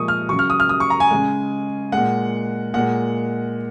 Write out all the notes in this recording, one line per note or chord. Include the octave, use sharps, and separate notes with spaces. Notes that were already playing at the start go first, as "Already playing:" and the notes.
Already playing: A#2 F3 G#3 C#6 D#6
F6
C#3 F#3 C#6
F6
D#6
F6
D#6
C#6
A#5
G#5
C#3 G#3
A#2 G#3 F#5
A#2 G#3 F#5